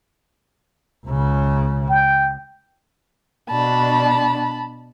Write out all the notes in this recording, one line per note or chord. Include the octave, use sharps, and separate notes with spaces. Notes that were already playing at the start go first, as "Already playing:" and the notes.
C#2 C#3
G5
B2 D4 A5 B5